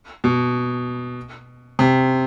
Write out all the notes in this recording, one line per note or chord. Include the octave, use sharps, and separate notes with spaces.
B2
C3